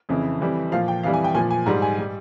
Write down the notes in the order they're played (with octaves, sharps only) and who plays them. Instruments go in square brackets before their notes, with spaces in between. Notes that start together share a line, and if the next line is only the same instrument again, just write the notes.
[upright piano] F2 C#3 E3
F2 E3 G3
A#2 F3 F5
G5
F2 E3 G3 F5
G#5
G5
A#2 F3 G#5
G#5
G#2 G3 A#5
G#5
G3